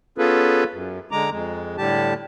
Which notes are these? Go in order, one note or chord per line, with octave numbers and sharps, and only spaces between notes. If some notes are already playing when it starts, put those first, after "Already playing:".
B3 C#4 F4 G#4 A4 B4
F#2
D3 G#3 A#5 D6
F2 G#3
A2 D3 G3 G4 A5